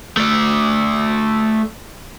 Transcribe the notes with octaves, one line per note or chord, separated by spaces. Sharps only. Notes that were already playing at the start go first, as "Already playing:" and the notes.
A3 D5